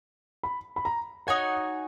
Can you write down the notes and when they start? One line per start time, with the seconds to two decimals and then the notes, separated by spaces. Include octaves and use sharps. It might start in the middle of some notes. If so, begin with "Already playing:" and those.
0.43 B5
0.76 B5
0.85 A#5
1.27 D#4 F#4 C#5 F#5 G#5